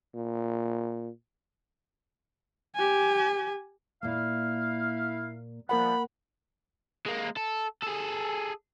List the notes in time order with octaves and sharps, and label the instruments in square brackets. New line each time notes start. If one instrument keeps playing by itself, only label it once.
[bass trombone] A#2
[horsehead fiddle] G4 G#5
[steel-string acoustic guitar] A#2 A#3 [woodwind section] E4 F5
[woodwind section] F3 G3 B3 [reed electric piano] A#3 A#4 F#5 [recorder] B5
[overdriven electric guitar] G#3 A#3
A4
G#4 A4